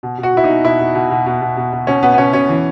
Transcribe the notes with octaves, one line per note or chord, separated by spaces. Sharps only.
B2
B2
F#4
B2 E4
D#4
B2
B2 E4
B2
B2
B2
B2
B2
B2
B2
B2 C#4
B2 B3
B3
B2 C#4
B2 C#4
E3